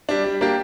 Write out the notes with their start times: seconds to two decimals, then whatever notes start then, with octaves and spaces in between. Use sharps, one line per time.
0.09 G3 D4
0.24 G3
0.41 A#3 D4 G4